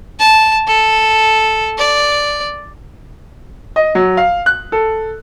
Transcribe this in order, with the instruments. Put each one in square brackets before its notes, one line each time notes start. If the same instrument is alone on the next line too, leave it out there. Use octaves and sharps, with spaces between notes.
[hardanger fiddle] A5
A4
D5
[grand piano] D#5
F#3
F5
F#6
A4